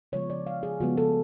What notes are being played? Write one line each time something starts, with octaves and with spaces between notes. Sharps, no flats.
C#3 F3 G#3 B3 C#5
D5
F5
G#4
C#3 F3 G#3 B3 F#4
A4